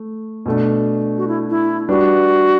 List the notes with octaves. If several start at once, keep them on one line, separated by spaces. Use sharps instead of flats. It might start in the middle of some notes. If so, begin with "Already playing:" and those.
Already playing: A3
B2 A3 D4
F#4
E4
E4
G3 D4 F#4 G4 B4